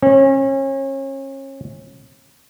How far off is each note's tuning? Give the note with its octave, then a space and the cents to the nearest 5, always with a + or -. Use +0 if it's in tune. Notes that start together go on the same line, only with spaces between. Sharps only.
C#4 -35